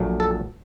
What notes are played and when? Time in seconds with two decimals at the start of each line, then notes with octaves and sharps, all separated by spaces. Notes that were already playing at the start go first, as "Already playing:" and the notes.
Already playing: A#1 A#2 F#3 A3
0.20 A4